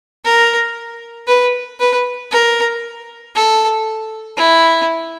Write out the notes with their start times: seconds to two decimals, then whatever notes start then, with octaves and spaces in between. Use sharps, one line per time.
0.25 A#4
1.27 B4
1.80 B4
2.31 A#4
3.35 A4
4.37 E4